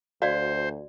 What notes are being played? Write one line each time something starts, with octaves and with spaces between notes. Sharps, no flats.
D2 F#4 C5 D5 F5